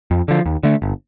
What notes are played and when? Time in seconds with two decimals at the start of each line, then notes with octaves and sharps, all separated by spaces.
0.11 F2
0.28 D3 F3
0.46 D#2
0.63 D3 A3
0.82 G1